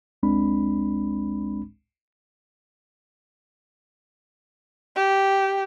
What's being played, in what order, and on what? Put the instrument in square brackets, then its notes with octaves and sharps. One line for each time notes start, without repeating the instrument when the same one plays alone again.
[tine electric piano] G1 C#2 G#3 C4 D4 B5
[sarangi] G4